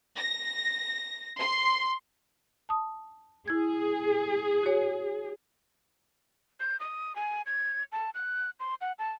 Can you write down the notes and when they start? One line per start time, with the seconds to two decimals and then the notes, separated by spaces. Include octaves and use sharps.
0.17 A#6
1.39 C6
2.69 A5 D#6
3.48 E4 G#4 G#6
4.63 F#4 C#5
6.60 G6
6.80 D#6
7.16 G#5
7.46 G#6
7.92 A5
8.14 F#6
8.60 C6
8.81 F#5
8.99 A5